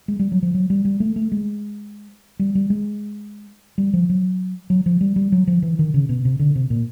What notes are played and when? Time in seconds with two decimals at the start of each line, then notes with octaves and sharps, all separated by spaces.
0.08 G#3
0.19 G3
0.32 F#3
0.43 F3
0.54 F#3
0.70 G3
0.85 G3
1.00 A3
1.16 A3
1.32 G#3
2.39 G3
2.55 G3
2.70 G#3
3.78 G3
3.93 F3
4.09 F#3
4.70 F#3
4.86 F3
5.01 G3
5.16 G3
5.32 F#3
5.47 F3
5.62 E3
5.79 D#3
5.94 C#3
6.09 B2
6.25 C3
6.40 D3
6.55 C3
6.70 A#2